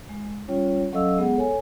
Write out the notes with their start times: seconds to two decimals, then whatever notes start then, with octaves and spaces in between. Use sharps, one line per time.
0.09 G#3
0.48 G3 C#4 F4 C#5
0.93 F#3 C#4 A4 D#5 F5 E6
1.18 G#3 B3 G#4 F#5
1.36 A4 C#5 G#5